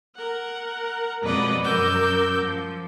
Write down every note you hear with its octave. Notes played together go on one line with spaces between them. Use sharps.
A#4 F#5
F2 B2 G#3 B4 D5 D#5
F#2 A#4 D6 E6 G6
F3